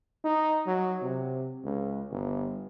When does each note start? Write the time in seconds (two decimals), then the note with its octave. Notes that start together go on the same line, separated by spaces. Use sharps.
0.24 D#4
0.67 F#3
1.02 C3
1.65 C#2
2.11 G1